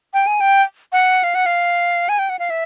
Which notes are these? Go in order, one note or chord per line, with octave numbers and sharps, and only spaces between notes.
G5
G#5
G5
F#5
F5
F#5
F5
G#5
G5
F#5
F5
E5